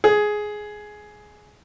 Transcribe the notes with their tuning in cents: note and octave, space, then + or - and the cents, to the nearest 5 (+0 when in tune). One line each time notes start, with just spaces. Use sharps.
G#4 +10